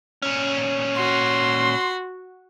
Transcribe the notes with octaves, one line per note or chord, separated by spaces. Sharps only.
A#2 C#4
F#4 C6